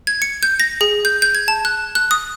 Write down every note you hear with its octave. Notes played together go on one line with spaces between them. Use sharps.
G#6
C#7
G6
A#6
G#4
G6
G6
G#6
A5
F#6
F#6
D#6